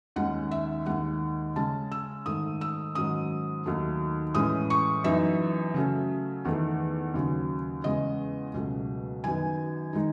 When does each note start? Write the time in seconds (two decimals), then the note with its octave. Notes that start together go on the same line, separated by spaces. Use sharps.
0.16 D#2 D#3 G#3 C#4 F#5
0.51 E5
0.86 D#2 D#3 G#3 F#5
1.56 C#3 G#3 C#4 A5
1.92 E6
2.26 G#2 D#3 A3 D#6
2.61 E6
2.95 G#2 D#3 F#3 C#4 D#6
3.66 D#2 D#3 F#3 A3
4.35 A2 E3 G#3 C#4 D#6
4.70 C#6
5.04 F#2 E3 B3 D#4 E5
5.74 C#3 F#3 A3 C#4
6.45 E2 D#3 A3
7.14 D#2 C#3 F#3
7.84 E2 C#3 G#3 D#5
8.54 C#2 B2 F#3 A3
9.24 F#2 D#3 F#3 B3 G#5
9.93 D#3 G#3 D#4